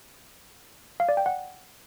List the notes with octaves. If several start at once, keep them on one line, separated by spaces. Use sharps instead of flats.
F5
D5
G5
F#5